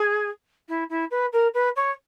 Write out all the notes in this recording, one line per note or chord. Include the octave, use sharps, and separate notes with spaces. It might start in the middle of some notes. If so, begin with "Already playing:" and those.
Already playing: G#4
E4
E4
B4
A#4
B4
C#5